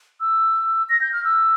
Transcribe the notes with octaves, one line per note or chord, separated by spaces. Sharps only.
E6
A#6
G6
F6
E6